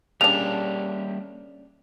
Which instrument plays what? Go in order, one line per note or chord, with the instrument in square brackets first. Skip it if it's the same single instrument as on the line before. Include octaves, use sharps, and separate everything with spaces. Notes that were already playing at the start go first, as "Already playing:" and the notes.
[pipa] C#3 D4 [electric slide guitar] G3 A#3 G4 [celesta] F7